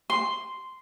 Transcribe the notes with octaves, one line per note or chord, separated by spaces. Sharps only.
C6